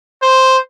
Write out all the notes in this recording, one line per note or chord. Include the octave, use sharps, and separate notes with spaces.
C5